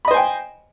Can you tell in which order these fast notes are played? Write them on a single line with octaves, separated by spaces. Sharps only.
B5 D#5 C5 G#5 G5